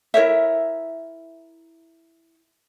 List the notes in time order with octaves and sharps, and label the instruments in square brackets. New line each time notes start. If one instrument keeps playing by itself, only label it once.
[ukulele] E4 A#4 C#5 E5